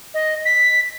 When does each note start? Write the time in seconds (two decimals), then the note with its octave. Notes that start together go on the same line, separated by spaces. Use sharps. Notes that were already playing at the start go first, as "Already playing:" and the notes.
0.14 D#5
0.45 B6